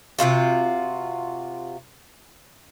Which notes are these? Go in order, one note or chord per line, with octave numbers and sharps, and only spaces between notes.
C3 D#3 F4 F#4